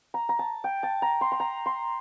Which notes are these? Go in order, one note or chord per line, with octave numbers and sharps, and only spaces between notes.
A#5
A#5
A5
G5
A5
A#5
C6
C6
A#5
C6